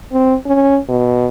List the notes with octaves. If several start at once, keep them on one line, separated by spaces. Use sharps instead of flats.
C4
C#4
B2